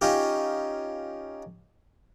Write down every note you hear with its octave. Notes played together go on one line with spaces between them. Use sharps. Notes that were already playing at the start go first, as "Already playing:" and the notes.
C#4 D#4 F4 G4